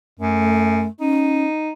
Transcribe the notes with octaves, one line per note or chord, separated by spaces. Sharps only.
F#2 A3
C#4 D#4